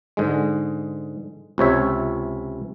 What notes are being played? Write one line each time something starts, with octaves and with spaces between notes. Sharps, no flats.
G#2 D3 G#3
C#2 C3 C#5 E5